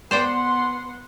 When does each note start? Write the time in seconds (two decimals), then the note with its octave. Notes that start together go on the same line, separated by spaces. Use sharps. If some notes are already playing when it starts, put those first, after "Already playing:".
0.11 B3 C5 D5 F#5 G5 C6